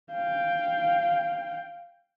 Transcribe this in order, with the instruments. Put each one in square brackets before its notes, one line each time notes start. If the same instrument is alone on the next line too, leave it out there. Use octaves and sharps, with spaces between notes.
[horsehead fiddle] F5 G5